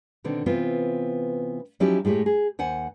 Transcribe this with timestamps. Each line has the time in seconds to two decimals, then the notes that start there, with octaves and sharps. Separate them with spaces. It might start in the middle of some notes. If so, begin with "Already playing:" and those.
0.24 B2 D3 D#3 C4
0.46 C3 E3 B3 C4 F4
1.80 F3 F#3 C#4 D#4 E4 G4
2.05 A2 G#3 E4 G4 C#5
2.26 G#4
2.59 D#2 C5 F#5 G#5